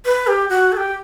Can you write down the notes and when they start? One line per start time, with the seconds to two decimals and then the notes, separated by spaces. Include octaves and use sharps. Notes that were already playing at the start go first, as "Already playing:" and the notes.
0.05 B4
0.27 G4
0.49 F#4
0.72 A4
0.77 G4